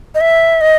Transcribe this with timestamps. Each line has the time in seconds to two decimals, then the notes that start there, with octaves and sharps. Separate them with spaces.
0.15 D#5
0.21 E5
0.61 D#5